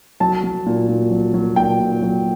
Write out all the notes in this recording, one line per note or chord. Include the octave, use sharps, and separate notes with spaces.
F#3 A5
F#3
A#2
A#2
F#3
F#3
A#2 G5
A#2
F#3